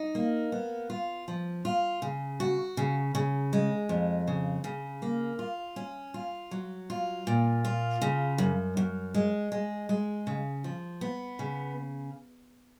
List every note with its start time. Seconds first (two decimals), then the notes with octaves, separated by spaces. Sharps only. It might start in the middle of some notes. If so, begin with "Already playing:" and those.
Already playing: D#4
0.15 A#3
0.52 B3
0.90 F4
1.28 F3
1.65 F4
2.02 C#3
2.40 F#4
2.77 C#3
3.15 C#3
3.53 G#3
3.89 F2
4.28 C#3
4.64 C#3
5.02 A#3
5.39 F4
5.76 C#4
6.14 F4
6.51 F#3
6.90 F4
7.27 A#2
7.65 F4
8.02 C#3
8.38 F#2
8.77 F#2
9.14 G#3
9.52 G#3
9.89 G#3
10.27 C#3
10.64 F3
11.01 B3
11.39 C#3